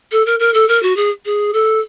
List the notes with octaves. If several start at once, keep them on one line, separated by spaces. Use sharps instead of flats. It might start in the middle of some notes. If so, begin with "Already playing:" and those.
A4
A#4
A#4
A4
A#4
F#4
G#4
G#4
A4